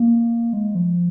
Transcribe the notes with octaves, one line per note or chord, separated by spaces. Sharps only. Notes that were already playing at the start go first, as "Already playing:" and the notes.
Already playing: A#3
G#3
F3